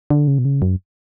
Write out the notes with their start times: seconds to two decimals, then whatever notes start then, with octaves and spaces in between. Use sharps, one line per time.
0.10 D3
0.28 C#3
0.38 B2
0.45 C#3
0.62 F#2